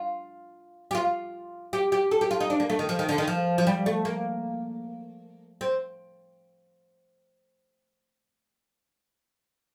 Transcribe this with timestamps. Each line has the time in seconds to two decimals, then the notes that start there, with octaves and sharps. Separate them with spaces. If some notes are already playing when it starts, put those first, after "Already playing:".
Already playing: F4
0.91 G4
0.95 F4
1.73 G4
1.92 G4
2.11 A4
2.21 G4
2.31 F4
2.40 D#4
2.50 D4
2.60 A#3
2.70 A3
2.79 D#3
2.89 F3
2.99 D#3
3.09 D3
3.18 D#3
3.28 F3
3.58 F3
3.67 G3
3.86 A3
4.05 A#3
5.61 C4